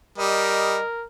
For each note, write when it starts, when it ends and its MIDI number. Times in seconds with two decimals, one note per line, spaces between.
0.18 0.77 55
0.18 1.06 70
0.18 0.82 75